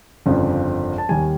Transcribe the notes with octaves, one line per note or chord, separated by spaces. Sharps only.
G1 F2 C#3 F3
A5
D#2 D#3 G3 G#5